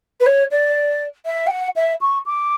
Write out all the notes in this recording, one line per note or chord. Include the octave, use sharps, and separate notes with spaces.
B4
C#5
D5
E5
G5
F#5
E5
C#6
D6